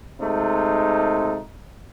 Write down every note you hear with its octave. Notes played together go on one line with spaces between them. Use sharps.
C3 G#3 A3 D#4